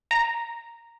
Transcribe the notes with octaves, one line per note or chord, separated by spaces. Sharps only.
A#5